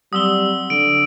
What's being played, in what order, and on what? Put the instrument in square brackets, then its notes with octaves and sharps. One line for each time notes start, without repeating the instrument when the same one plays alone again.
[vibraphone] F#3 C4 [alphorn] G3 [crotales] D#6 E6 G7
[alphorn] D3 [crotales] D7